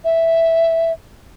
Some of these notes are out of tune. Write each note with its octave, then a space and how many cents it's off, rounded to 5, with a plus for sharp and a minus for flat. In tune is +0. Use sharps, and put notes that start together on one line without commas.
E5 +0